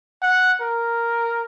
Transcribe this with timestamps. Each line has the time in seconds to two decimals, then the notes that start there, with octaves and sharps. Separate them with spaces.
0.22 F#5
0.62 A#4